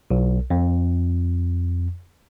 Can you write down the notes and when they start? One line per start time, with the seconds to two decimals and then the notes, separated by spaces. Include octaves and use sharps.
0.11 B1
0.50 F2